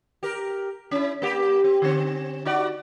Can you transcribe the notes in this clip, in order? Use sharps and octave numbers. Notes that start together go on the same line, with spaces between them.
G4 A#4
C#4 E4
A#3 G4
C4
D3 C4
D#4 F#4 D5